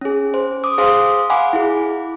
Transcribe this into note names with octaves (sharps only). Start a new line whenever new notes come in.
C#4 G#4
C5
D6 D#6
G#4 C5 F5 C6 D#6
F5 F#5 G#5 B5 D6
E4 G#4